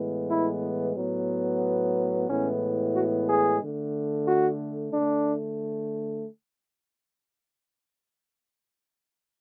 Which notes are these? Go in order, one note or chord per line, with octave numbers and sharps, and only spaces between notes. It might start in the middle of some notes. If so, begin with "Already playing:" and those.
Already playing: A2 E3 G#3 B3
E4
A2 F#3 B3
A2 E3 G#3 B3 C#4
F#4
G#4
D3 A3
F#4
D3 A3 D4